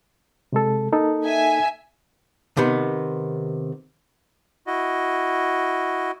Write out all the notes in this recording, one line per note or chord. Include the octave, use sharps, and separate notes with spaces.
C3 G#3 A4
A#3 D#4 A4
E5 G#5
C3 D#3 B3
E4 F#4 D#5